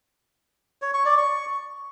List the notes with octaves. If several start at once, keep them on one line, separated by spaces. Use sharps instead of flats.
C#5
C#6
D5
C#6